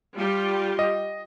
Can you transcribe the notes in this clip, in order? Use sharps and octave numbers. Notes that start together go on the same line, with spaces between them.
G3 F4 G4
D#5